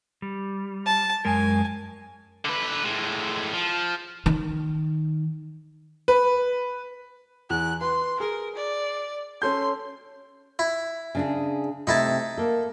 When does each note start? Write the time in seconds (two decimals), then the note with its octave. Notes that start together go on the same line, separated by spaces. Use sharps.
0.22 G3
0.86 A5
1.25 F#2 G#3 A#4 G#5
2.45 D3 B4
2.84 A2 G#3
3.54 F3
4.26 D#3
6.08 B4
7.50 E2 F#6
7.81 B4 C6
8.20 G#4 A#4
8.55 D5
9.42 C#4 A4 C6 G6
10.59 E4
11.15 C#3 D4 G#4
11.87 C3 A3 C4 D#4 E4 A5
12.38 A#3 A4